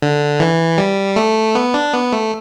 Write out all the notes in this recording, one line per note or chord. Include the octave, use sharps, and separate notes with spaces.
D3
E3
G3
A3
B3
D4
B3
A3